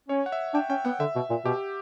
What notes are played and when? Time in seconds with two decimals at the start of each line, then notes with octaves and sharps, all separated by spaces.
0.09 C#4 C#5
0.26 F#5
0.32 E5
0.54 D4 G5
0.70 C#4 G5
0.85 B3 F#5
1.00 D3 E5
1.15 B2
1.30 A#2
1.45 B2 G4